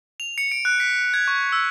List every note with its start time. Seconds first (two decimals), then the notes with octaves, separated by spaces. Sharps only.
0.20 F7
0.38 C#7
0.52 D7
0.65 F#6
0.80 B6
1.14 G#6
1.28 C#6
1.52 E6